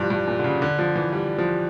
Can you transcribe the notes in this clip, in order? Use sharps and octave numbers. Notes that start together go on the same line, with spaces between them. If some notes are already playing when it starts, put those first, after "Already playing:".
Already playing: G2 E3 F3 G3
G2
A#2
D3
C#3
D3
F3
E3
G3
F3